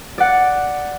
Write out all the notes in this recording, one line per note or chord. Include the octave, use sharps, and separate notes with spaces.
D5 F#5